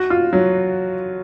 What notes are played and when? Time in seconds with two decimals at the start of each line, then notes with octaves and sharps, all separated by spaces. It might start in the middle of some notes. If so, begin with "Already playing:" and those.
Already playing: F#4
0.10 F4
0.33 F#3